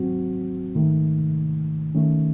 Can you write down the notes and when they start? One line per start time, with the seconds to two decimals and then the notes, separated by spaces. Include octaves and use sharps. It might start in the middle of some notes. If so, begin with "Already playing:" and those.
Already playing: G#2 F#3 C4 F#4
0.75 G#2 D#3 A3
1.95 D#3 A3 C#4